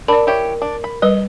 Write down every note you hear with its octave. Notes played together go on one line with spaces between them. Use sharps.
D4 A#4 D5 B5
E4 G4 C#5
D4
B5
G3 B4 D#5